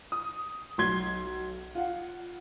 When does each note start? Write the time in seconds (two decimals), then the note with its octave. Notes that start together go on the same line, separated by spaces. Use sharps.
0.12 D#6
0.78 B1 C6 G#6 G7
1.75 F4 F#5